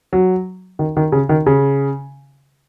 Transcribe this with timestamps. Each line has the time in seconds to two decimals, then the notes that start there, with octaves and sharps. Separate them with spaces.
0.13 F#3
0.79 D#3
0.97 D#3
1.12 C#3
1.29 D#3
1.46 C#3